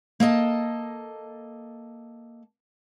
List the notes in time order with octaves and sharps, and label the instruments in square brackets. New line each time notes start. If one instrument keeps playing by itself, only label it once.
[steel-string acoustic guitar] A#3 A4 D#5 A5